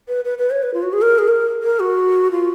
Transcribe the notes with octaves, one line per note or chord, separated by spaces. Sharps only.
B4
B4
B4
C#5
B4
F4
F#4
G#4
A#4
G#4
A#4
A#4
F#4
F4